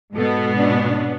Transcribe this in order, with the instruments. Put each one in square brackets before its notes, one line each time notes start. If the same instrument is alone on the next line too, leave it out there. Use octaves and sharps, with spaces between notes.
[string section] G#2 B2 B3 [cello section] A4
[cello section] C#4 D4